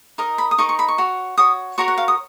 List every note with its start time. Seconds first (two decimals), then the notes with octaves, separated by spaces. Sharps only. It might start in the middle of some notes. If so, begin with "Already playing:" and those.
0.18 D#4 A#4 D#5
0.38 B5
0.51 D#6
0.58 D#4 A#4 D#5 C#6
0.69 C#6
0.79 B5
0.88 C#6
0.98 F#4 C#5
1.38 F#4 C#5 D#6
1.78 F#4 A#4 C#5 C#6
1.88 F#5
1.98 F5
2.08 D#6